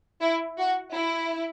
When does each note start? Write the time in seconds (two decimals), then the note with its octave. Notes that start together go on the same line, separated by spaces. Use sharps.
0.21 E4
0.58 F#4
0.95 E4